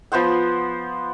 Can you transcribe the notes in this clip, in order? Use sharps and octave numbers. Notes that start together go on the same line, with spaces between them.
F3 B3 C5 F#5